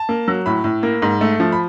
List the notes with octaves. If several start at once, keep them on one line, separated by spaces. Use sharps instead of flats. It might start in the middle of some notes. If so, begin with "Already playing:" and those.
Already playing: A5
A#3
F#3
A2 B5
A2
A#3
G#2
A3
F3
B5